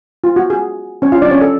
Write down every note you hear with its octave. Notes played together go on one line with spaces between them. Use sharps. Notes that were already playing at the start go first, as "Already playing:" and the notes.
F4
F#4
G#4
C#4 C#5
F4 F5
D4 D5
C#4 C#5
A4